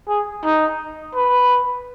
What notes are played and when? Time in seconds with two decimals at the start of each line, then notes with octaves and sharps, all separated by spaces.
0.08 G#4
0.45 D#4
1.15 B4